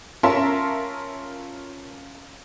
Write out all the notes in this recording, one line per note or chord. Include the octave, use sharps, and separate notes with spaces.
C#4 F4 A#4 E5 A5 C6